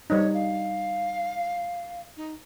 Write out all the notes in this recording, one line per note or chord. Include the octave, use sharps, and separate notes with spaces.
G3 D#4 C#5
F5
D#4